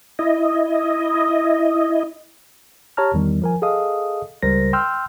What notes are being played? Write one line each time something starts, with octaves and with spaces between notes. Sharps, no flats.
E4 D#5
G4 C#5 A5 A#5 F6
E2 D#3 G3
F3 A#4 G#5
G#4 A4 D#5 F5 D#6
C#2 C#3 G3 A#4 C5 A#6
G5 C6 E6 F6 G6